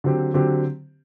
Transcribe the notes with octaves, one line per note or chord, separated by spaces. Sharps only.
D3 F#3 C4 G4
D3 F#3 C4 G4